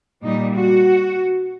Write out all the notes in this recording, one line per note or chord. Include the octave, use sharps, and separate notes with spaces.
A#2 G3 D#4
F#4